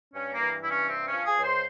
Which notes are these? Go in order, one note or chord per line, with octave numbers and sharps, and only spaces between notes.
G2 C#4
A#3
E3
G2 E4
C#4
C3 C4
C#4
F3
G#4
C#2
C5